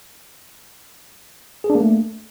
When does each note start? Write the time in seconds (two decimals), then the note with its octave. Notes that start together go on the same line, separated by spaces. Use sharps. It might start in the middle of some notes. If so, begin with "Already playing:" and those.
1.64 G#4
1.70 D4
1.75 A#3
1.81 A3